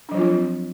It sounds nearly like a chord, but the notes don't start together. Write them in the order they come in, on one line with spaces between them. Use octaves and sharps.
D4 F#3 F3 F4 C4